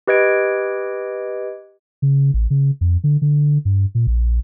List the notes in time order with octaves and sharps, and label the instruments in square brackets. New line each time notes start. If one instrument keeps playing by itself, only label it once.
[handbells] G4 B4 D#5 G#6 D7
[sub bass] C#3
A1
C#3
F2
D3
D3
G2
A#2
A#1